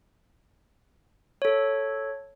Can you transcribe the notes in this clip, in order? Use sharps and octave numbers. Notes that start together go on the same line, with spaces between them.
A4 C#5